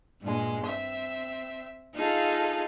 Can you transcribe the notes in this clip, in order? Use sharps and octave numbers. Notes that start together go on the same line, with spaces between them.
G2 A#2 G#3
C4 E5
D#4 F4 G#4 A4 F5